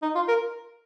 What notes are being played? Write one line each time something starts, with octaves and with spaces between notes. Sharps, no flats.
D#4
F4
A#4